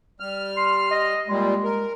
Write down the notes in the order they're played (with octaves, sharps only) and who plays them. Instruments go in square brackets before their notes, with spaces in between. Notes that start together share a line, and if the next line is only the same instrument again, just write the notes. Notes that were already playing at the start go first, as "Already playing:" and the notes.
[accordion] G3 F6
[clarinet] C6
D#5
[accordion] A#2 G3 [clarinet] G#3
[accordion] A#4